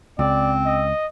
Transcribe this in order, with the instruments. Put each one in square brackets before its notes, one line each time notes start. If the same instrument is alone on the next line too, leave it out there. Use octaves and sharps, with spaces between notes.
[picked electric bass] C#2 [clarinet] C4 [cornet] D5
[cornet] D#5